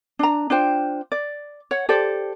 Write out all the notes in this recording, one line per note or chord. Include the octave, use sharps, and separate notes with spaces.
D4 A#5
D4 F4 C5 G5
D5
C#5 F#5
G4 A4 C5 D5